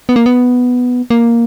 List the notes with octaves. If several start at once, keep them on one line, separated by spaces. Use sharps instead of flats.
B3
A#3
B3
A#3